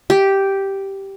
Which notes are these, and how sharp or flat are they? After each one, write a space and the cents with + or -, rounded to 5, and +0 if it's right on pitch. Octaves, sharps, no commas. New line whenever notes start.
G4 -5